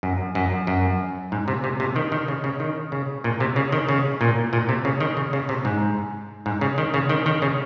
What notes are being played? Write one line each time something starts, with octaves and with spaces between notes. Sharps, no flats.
F#2
F#2
F#2
G#2
C3
C3
C3
D#3
D#3
C#3
C#3
D#3
C#3
A#2
C3
C#3
D#3
C#3
A#2
A#2
C3
C#3
D#3
C#3
C#3
C3
G#2
G#2
C#3
D#3
C#3
D#3
D#3
C#3